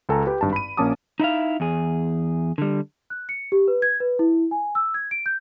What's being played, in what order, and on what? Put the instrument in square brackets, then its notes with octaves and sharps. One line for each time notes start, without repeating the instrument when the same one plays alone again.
[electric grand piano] C#2 A4 G#5 A#5
G4 B4 G5
G#1 G2 A5
B5 D#7
A#1 A#3 C#4 A5 D6 D#6
[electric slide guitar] D#4 E4 E5 F5
E2 G#4
D3 G3
[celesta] F#6
C#7
G4
B4
G#6
B4
E4
G#5
E6
G#6
D7
G6